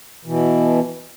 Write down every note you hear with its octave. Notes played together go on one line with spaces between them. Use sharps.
B2 E3